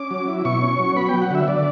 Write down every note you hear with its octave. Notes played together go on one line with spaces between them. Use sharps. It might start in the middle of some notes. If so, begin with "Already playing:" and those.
Already playing: C#4 D6
F#3
E4
B2 C#6
C#4
F#3
B3 B5
F#3 G5
F#5
D3 E5
D3 D5